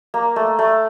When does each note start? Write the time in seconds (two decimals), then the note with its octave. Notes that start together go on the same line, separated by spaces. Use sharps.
0.14 A#3
0.36 A3
0.59 A3